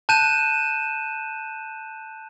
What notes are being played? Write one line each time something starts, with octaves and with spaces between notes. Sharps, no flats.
A5 F#6 G6 D#7 E7